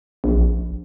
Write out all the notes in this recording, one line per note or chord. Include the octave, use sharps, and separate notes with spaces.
A#1